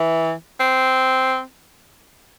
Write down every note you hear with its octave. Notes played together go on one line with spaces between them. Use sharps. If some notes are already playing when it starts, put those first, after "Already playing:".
Already playing: E3
C4